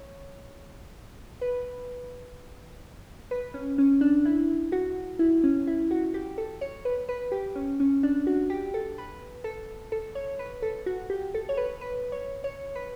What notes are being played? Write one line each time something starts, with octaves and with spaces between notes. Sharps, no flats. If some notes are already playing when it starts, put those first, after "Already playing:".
Already playing: C#5
B4
B4
C#4
C#4
D4
E4
F#4
E4
C#4
E4
F#4
G4
A4
C#5
B4
B4
G4
C#4
C#4
D4
F#4
G4
A4
B4
A4
A4
C#5
B4
A4
F#4
G4
A4
C#5
B4
B4
C#5
C#5
B4